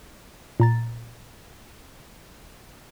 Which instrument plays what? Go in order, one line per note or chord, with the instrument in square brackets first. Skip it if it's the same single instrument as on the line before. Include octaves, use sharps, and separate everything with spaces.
[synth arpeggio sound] A#2 A#5 A6